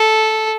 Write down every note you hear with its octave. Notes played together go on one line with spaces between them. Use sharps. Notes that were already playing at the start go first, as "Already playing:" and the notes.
Already playing: A4